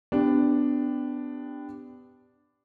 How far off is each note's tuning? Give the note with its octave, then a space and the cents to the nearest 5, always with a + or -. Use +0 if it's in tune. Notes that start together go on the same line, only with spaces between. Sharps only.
B3 +25 D4 +0 G4 +0